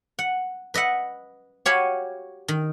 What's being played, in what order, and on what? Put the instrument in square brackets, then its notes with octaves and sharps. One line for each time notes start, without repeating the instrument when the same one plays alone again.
[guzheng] F#5
B4 D#5 E5 F#5
F#4 G4 C#5 F5 G#5 B5
D#3